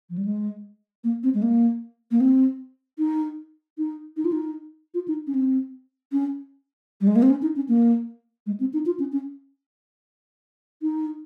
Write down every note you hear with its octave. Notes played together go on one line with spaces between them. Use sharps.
F3
G3
G#3
A#3
C4
G#3
A#3
A#3
C4
D#4
D#4
D#4
F4
D#4
F4
D#4
C#4
C4
C#4
G3
G#3
A#3
C4
C#4
D#4
C#4
A#3
G#3
C4
D#4
F4
C#4
C#4
D#4